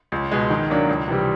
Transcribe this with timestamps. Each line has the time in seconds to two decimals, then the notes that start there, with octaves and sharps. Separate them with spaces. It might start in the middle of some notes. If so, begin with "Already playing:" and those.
0.12 C#2
0.32 B2 G#3
0.50 D#3
0.70 F#3 A#3 D4
0.89 C#2
1.08 C3 E3 G3